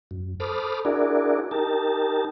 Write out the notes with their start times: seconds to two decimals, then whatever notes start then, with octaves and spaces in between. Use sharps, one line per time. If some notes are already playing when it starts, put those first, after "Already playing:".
0.11 F#2
0.40 A4 C5 B5 D6 D#6 F6
0.85 D4 E4 F#4 G#4 A#4 D5
1.51 D#4 G4 A#4 A5